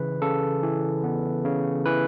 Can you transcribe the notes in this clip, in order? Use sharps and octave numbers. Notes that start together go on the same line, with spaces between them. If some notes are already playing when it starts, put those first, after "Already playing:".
Already playing: C#3 E3 B4
C#3 A4
E3
B3
C#3
E3 B4